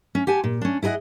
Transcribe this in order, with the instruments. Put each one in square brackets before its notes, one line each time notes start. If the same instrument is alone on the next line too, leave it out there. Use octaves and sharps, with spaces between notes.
[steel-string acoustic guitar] C#4
G4 F#5 G#5 A5
A#2
C#4 D4
E4 G#4 A#4 D#5 F#5